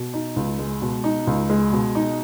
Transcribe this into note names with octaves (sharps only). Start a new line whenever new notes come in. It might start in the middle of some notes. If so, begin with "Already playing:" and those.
Already playing: B2
D#4
C#2
G#3
B2
D#4
C#2
G#3
B2
D#4